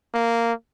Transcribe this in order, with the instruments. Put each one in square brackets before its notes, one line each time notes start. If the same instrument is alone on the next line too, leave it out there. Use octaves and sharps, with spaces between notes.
[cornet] A#3